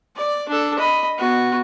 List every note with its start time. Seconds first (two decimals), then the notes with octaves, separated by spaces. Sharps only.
0.16 D5
0.48 D4 A4
0.79 D#5 B5
1.18 B3 F#4